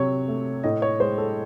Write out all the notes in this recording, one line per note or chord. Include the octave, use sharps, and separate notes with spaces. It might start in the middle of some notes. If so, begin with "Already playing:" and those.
Already playing: C3 F#3 C#5
A3
A2 D#5
C#5
G#3 C5
A4